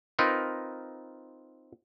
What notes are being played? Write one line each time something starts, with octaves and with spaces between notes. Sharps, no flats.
C4 D#4 F4 A#4 B4